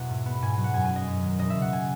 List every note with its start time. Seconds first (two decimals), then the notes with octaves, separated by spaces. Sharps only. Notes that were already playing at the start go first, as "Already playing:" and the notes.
Already playing: E1 E2 B2 E5 F#5
0.09 G#2
0.26 B3
0.42 G#2 G#5
0.53 F#3 G#5
0.64 F#5
0.73 F#2 G#5
0.85 G#5
0.90 F#3
0.96 D#5
1.07 F#2
1.23 D#3
1.39 E1 D#5
1.50 E5
1.56 C#3
1.62 F#5
1.73 G#5